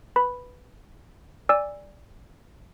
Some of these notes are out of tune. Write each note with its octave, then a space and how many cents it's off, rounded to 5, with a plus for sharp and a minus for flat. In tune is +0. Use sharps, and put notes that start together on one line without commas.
B4 +0 B5 +0
D5 +0 G#5 -25 E6 +0